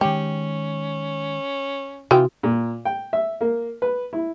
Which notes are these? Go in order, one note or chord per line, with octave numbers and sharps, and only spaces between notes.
D#3 G#3 C#4 G4
C3 E3 F4 F#4 G5
A#2
G5
E5
A#3
B4
E4